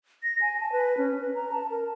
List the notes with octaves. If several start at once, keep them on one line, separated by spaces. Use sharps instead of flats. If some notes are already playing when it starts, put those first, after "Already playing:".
A#6
G#5
A5
B4
C#4
B4
A#5
A5
A#4